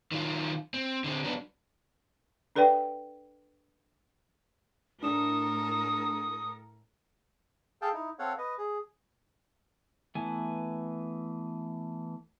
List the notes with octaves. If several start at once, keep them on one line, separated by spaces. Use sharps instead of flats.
D#3 F#3 F4
C4
D3 C4
F#3 B3 D4
D4 A4 B4 D5 G5
A2 D4 A4 A#4 D#6 E7
G#4 A4 F5 G5 A5
D#4 E4
C4 A4 C#5 F5 F#5
B4 D#5
G#4
E3 A3 B3 G#5